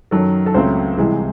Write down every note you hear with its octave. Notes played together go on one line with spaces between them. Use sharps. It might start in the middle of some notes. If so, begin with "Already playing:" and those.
F#2 D#3 F#3 A4
A4
C#2 C#3 F#3 A3 C4 C5
C2 C3 E3 G#3